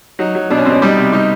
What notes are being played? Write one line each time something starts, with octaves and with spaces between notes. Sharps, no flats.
F#3 D#4
F#3
B2 D4
C#4
B2 C4
C#4
G3 D#4
C3
G3 D#4